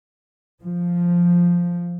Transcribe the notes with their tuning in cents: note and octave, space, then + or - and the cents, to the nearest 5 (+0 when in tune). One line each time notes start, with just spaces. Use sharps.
F3 +0